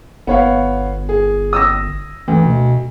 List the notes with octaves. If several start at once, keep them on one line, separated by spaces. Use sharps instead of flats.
G1 B3 C#5 F5
G#4
D#6 E6 A#6
D2 E3
B2